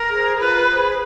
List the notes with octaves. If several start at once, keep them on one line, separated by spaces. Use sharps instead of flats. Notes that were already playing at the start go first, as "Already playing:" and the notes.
Already playing: A#4
G#4 C5
F4 B4
G#4 C5